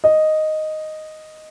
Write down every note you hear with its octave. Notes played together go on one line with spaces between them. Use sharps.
D#5